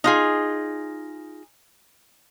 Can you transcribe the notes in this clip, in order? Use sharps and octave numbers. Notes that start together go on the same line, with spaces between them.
D#4 F4 G#4